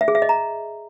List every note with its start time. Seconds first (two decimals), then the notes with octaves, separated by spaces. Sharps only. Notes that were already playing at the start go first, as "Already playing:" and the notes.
0.01 E5
0.08 G#4
0.15 E5
0.22 D#5
0.29 A#5